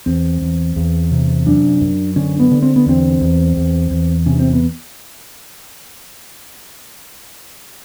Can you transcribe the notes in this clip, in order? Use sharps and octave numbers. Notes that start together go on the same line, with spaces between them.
E2 C4
E2
E2
C3
F#2 D4
F#2
D3 C#4
B3
D3
C4
B3
E2 C4
E2
E2
E2
C3 C#4
C4
B3